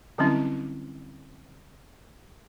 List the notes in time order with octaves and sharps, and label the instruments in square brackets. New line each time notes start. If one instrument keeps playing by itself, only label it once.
[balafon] D3 F#3 G3 C4 C#4 E4